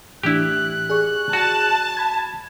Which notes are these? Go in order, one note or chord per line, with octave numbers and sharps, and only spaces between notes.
A2 E3 D4 E4 G4 F#6
G#4 D5 C#6
F#4 A5
B5 G#6